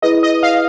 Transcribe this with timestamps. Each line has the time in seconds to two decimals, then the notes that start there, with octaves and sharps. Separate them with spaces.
0.02 E4 G#4 B4 D#5
0.23 D#5
0.43 F5